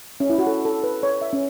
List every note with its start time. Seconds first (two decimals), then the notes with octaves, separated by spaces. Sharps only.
0.20 C#4
0.30 E4
0.38 F#4
0.47 A4
0.65 A4
0.83 B4
1.03 C#5
1.21 E5
1.33 C#4